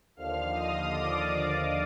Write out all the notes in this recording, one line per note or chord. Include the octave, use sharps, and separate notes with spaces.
D#2 D3 F3 F5 F6
D#5 D#6
D5 D6